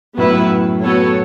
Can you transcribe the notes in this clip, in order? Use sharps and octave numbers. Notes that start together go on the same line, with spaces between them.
F#2 A2 B3 E4 B4
B3 F#4 A4 C#5